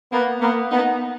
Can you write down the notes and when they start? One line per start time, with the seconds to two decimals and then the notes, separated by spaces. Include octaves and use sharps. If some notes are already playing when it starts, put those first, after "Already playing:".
0.12 A#3 B3
0.41 A#3 B3
0.71 B3 D#4